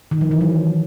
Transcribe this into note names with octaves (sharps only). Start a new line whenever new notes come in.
D#3
F3
E3
F#3